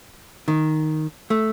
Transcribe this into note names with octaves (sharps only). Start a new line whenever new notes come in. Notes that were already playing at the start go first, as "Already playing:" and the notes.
D#3
A3